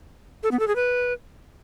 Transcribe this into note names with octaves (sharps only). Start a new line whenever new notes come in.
A4
B3
A4
G#4
B4